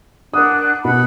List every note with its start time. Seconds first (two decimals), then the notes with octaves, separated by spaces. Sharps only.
0.34 D4 A#4 F#5 D#6 F#6
0.85 B2 F#5 B5 F#6